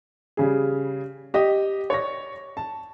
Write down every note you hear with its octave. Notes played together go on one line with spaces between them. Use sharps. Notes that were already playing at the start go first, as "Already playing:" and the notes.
C#3 G3 G#4
G4 D#5
C#5 D5 C#6 A#6
A5